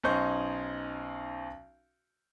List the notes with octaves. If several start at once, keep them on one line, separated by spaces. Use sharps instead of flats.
B1 C#4 D#4 C5 C#6 G6